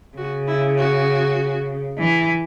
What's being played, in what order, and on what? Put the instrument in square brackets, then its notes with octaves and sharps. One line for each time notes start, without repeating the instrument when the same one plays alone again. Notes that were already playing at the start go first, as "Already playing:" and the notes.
[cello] C#3 [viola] F#4
[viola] E4
F#4
[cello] E3